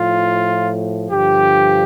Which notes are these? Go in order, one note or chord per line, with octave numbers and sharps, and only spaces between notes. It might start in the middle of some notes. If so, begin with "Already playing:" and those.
Already playing: A2 F3 F4
G2 D3 F3 G4